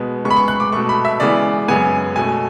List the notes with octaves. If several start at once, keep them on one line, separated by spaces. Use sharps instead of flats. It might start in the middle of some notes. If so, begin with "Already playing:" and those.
Already playing: B2 G#3 B3
C#3 G#3 B3 C#6
B5
C#6
F#6
D6
B2 A3 C#6
B5
E5
C#3 E3 G#3 B3 D5
F#2 C#3 G#3 B3 G#5
B2 A3 G#5